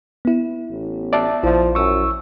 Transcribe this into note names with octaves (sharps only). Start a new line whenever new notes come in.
B3 E4
A1
D5 E5 A5
A#1 F3 E4
F#2 C#6 E6